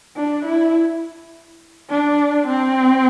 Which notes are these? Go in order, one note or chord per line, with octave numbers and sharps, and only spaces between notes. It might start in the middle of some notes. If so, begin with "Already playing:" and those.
D4
E4
D4
C4